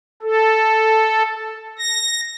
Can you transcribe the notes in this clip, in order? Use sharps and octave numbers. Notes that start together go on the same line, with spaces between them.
A4
A#6